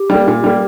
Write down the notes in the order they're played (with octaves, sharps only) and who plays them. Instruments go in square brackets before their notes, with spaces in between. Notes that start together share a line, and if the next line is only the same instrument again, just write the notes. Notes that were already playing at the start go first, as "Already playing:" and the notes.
Already playing: [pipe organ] G4
[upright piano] G3 A#3
A#2
G3 A#3